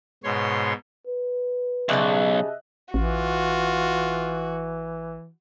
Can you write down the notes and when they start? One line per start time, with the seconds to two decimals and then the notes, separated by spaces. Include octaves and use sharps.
0.24 G#2 B2 C#5 C6
1.07 B4
1.89 B1 C#3 G3 D#5 E5 A5 F#6
2.94 A1 E3 F4 F#4